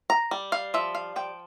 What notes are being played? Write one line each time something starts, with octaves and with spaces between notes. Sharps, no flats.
A#5
G3
F5
F3 E5
F5
F3 G5